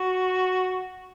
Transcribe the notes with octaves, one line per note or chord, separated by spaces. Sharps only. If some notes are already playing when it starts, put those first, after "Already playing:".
Already playing: F#4